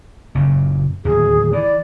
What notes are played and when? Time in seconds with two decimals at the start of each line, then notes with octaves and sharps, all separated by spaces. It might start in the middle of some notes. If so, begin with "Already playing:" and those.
0.35 F#1 A#2 C#3
1.05 D1 D#2 G#4
1.53 E3 D5